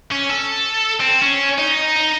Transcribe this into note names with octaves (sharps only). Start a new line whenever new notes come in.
C#4
A4
C4
C#4
D#4
D#4